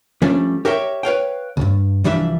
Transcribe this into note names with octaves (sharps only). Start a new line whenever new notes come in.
F3 G3 A3 C#4 D4
G4 A#4 C#5 E5 G5
B4 C#5 F5 G5
C#2 G2
C2 E3 F3 G3 D4 E5